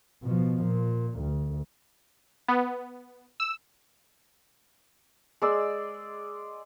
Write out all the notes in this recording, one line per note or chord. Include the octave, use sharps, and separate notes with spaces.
B2 F3
A#2
D2
B3
E6
G#3 G#4 D5 E6